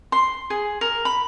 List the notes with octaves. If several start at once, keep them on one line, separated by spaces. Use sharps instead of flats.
C6
G#4
A#4
B5